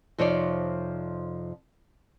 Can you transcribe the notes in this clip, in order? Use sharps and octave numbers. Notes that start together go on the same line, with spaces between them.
F2 C3 F3 D#4 C#5 D5